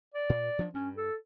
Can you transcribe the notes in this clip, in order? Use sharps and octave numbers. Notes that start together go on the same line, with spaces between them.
D5
A#2
F3 F#3 D4
G2 C#4
A4